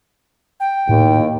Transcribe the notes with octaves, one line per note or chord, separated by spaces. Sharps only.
G5
D#2 A2